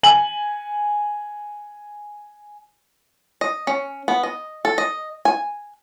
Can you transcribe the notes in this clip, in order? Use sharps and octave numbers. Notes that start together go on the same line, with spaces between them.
G#5 F#7
D#5
C#4
B3
D#5
A4
D#5
G#5